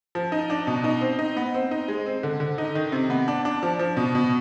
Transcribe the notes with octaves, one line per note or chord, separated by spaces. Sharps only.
F3
D#4
D4
B2
D#4
C4
D#4
B3
C4
D#4
G#3
C4
D3
D3
D#4
D#3
C3
B3
D4
D4
F3
F3
B2
B2